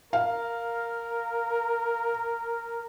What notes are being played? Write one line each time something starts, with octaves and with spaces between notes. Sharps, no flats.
A#4 F5